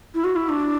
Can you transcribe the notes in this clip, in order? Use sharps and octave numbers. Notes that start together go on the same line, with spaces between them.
E4
F#4
E4
D4